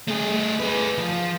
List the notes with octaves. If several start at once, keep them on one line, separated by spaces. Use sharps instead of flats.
A3 G#4
G#4 B4
F3